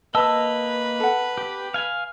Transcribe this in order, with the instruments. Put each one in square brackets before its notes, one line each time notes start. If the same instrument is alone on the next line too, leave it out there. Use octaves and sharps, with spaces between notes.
[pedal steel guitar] A#3 D#5 E6 [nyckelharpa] B4 [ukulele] A5
[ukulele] A4 F#5
[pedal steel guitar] G4
F5 G#5